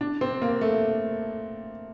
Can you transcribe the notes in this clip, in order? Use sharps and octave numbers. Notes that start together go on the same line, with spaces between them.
D4
C4
A#3
A3